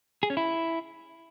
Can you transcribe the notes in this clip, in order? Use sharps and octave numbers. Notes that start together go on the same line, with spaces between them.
G#4
C#4
E4